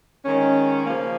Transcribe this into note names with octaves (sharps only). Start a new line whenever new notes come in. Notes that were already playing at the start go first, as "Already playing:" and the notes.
D#3 G#3 C#4
C#3 F3 A#3